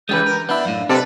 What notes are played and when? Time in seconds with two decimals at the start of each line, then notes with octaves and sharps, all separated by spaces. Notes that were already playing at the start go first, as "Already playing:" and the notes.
0.09 C#3 E3 G#3 G4 B4 G6
0.26 A#4
0.49 B3 D4 E4 B5
0.65 F#2 A2 F5
0.89 C3 A4 B4 D5 D#5